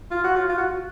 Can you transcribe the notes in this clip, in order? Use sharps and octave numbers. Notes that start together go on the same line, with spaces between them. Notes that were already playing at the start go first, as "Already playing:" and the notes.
F4
F#4
F4
F4
F#4